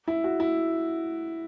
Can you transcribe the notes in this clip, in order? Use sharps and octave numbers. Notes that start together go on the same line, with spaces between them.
E4
F#4
E4